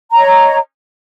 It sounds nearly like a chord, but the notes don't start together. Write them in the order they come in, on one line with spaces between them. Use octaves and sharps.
A#5 C#5 D#5